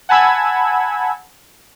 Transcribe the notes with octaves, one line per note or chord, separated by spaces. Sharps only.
F#5 G#5 A5 B5 E6 G#6